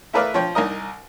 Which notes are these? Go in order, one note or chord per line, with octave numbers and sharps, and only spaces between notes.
A3 E4 A#4 B4 D5 F5
F3 C#5 G5
C2 D#4 A#4 D#5